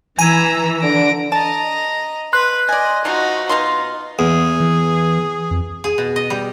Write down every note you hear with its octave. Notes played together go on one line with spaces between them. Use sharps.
E3 G#5 A#5 E6
D3 D4 A#6 D7
D#5 A5 A#5
B4 C6 F#6
D5 D#5 G#5
F3 A3 D#4 F4 F#4
B2 D#4 F4 C6
E2 G#4
E3
F2
G#4
B2
D#5
G3